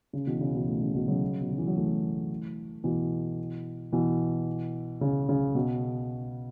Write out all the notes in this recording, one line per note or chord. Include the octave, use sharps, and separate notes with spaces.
C#3
B2 E3
C#3
B2 E3
E3 A3
C#3
B2 E3
C#3 F#3
B2
C#3
E3
F#3
E3 A3
B2 E3
B2 E3
C#3
C#3
B2